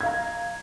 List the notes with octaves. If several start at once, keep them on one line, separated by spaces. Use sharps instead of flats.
F5 A#5 G#6